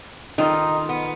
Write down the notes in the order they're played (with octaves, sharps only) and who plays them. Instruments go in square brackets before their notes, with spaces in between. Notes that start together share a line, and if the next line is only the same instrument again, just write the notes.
[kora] D#3 F4 A4 [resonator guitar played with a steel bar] D#4
[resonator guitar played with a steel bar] B3